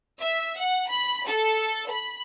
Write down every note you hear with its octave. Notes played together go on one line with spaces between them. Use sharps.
E5
F#5
B5
A4
B5